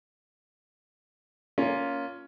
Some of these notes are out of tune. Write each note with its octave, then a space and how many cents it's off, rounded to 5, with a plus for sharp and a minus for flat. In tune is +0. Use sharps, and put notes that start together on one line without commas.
A#3 +0 C#4 +15 F4 +0